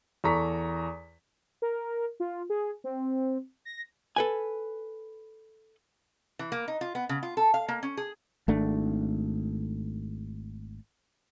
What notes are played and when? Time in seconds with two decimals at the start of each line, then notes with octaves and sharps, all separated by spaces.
0.24 E2 A4 A#5 C#6 B6
1.62 A#4
2.20 F4
2.50 G#4
2.84 C4
3.65 A#6
4.16 A4 B4 G#5
6.39 E3
6.52 A#3
6.68 D#4
6.81 F4
6.95 B3
7.09 C#3
7.23 F4
7.37 A4
7.54 F5
7.68 A#3
7.83 C#4
7.97 G#4
8.48 G#1 A3 D4